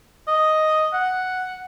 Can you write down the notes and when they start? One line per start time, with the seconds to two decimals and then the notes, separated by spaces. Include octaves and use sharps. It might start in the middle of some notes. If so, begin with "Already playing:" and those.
0.27 D#5
0.93 F#5